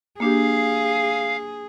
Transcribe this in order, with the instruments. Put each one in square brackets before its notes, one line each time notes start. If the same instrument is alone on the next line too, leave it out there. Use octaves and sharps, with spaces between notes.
[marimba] A#3 D4 G4 [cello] G#4 [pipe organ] F5